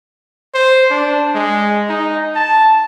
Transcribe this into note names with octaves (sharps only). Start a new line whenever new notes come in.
C5
D4
G#3
D#4
A5